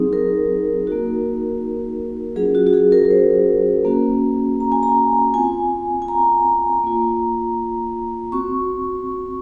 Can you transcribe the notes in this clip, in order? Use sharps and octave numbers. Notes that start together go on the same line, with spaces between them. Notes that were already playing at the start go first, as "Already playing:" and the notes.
Already playing: F#3 C4 D#4 G#4
A#4
A#3 D#4 F#4
F#3 C#4 F4 G#4
F#4
F#4
G#4
A#4
A#4
C5
A#3 C#4 F#4
A#5
G#5
A#5
C4 F4 G#5
G#5
A#5
A#3 F4
C4 F#4 C#6